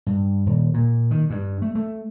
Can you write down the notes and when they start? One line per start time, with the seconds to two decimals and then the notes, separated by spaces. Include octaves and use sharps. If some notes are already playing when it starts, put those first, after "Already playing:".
0.06 G2
0.46 D#1
0.74 A#2
1.11 D#3
1.30 G2
1.62 A3
1.75 A3